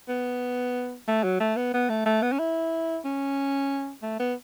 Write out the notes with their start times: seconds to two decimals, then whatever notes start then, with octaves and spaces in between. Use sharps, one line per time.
0.08 B3
1.07 A3
1.23 F#3
1.40 A3
1.56 B3
1.74 B3
1.89 A3
2.06 A3
2.22 B3
2.32 C#4
2.39 E4
3.05 C#4
4.02 A3
4.20 B3